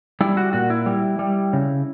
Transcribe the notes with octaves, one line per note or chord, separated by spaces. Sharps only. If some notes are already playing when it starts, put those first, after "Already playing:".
G3 E4
F#4
A#2 F#4
E4
G3
G3
C#3